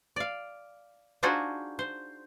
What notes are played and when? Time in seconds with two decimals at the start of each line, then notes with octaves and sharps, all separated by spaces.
0.16 D5 F5
1.23 D4 D#4 F4 F#4 G#4 C5
1.79 C5